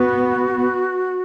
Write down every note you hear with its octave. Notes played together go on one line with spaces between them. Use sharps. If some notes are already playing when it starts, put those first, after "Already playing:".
Already playing: B3 F#4